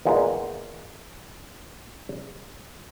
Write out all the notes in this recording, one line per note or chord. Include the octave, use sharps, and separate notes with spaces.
E2 A#2 G#3